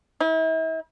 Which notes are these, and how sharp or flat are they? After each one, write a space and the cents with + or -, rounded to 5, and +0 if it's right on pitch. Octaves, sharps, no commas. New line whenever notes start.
E4 -40